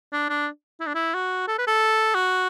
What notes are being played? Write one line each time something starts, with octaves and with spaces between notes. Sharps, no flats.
D4
D4
E4
D4
E4
F#4
A4
B4
A4
F#4